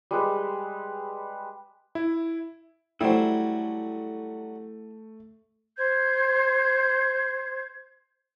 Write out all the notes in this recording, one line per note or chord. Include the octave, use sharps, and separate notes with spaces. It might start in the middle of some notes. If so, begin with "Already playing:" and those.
G3 G#3 B4
E4
F#3 G3 A3 E4 C5
C5 G6 G#6